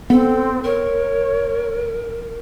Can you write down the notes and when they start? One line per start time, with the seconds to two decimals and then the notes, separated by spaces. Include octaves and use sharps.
0.10 B3 C4 A4
0.64 A#4 C#5